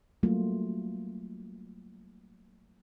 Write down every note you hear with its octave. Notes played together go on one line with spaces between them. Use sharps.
F#3 G3 A3 A#3 F4